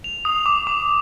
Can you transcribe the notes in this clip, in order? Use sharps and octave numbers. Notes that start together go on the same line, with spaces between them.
F7
D#6
D6
D6